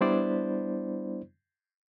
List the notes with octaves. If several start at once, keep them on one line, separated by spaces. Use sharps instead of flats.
G3 B3 D4 E4 C5 D5